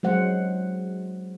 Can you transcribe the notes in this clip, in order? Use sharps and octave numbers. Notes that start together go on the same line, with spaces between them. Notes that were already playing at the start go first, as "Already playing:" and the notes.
F#3 G#3 C5 F#5